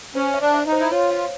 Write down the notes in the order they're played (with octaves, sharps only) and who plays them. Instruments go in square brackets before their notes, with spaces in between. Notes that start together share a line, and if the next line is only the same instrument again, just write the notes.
[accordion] C#4 [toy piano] C5
[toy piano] E5
[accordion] D4
[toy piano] E5
[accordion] D#4
[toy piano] C5
[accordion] E4
[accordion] F4 [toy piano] C#5
[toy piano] F5